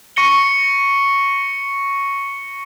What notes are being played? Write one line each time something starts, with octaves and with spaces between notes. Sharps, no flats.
C#6 A#6 C#7 G7